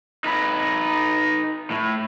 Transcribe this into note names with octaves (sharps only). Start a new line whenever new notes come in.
D#4 B4
A2